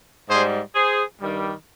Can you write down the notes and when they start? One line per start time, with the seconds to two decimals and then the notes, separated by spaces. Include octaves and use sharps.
0.29 G#2 G3 G#4 C5
0.75 G#4 C5
1.20 G2 D#3 G3